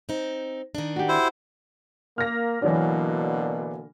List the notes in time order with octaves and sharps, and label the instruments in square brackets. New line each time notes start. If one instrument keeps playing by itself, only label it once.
[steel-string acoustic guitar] C4 D#4
D#3 D4
[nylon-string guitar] F#4 G4
[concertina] E4 C5
[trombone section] A#3 [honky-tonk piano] F6 A#6
[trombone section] B2 D3 A#3 [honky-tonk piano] E3 F#3 D4